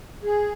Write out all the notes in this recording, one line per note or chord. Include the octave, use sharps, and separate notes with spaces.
G#4